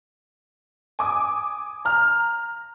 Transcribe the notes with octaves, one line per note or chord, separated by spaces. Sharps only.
G#5 D6 D#6
A#5 F6